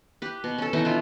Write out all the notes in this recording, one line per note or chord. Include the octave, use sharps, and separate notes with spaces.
G4 B4
B2
C#4 A4
B2 E3 D#4 C#6
D4 E4 F4